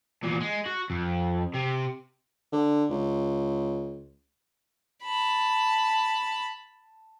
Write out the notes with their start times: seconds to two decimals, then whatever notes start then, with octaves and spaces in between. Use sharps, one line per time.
0.23 E2 A#2
0.41 G#3
0.66 F#4
0.90 F2
1.54 C3
2.52 D3
2.90 C#2
5.04 A5 B5